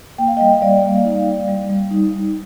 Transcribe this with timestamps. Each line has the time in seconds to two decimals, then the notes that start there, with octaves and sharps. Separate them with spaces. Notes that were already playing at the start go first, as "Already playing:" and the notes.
0.18 A#3 G5
0.28 F5
0.37 D#5 G5
0.41 G3
0.62 G3 D5 F5
0.83 A#3
1.05 D#4
1.26 G3
1.48 G3
1.69 G3
1.90 D#4
2.13 D#4